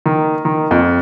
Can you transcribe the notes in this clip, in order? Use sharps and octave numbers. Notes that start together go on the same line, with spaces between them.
D#3
D#3
F2